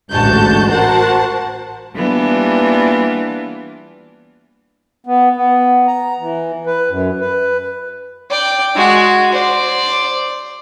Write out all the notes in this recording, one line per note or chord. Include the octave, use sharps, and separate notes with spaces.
A1 D2 G#2 F#4 A5 G6
F#4 A#4 C5 F#5 A5
E3 G3 A#3 B3 D4 F4
B3
B3
A#5
E3
B4
F#2
B4
D5 G5
G#3 F#4
C5 D5